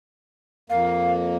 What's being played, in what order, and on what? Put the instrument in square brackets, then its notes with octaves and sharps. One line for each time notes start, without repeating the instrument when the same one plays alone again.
[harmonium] F2 A#3 [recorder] F5